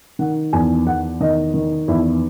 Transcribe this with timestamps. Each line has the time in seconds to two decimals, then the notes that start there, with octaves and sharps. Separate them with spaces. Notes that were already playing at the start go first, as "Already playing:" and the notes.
0.19 D#3 F#5
0.53 E2 G#5
0.87 E2 F#5
1.20 D#3 D#5
1.54 D#3
1.88 E2 E4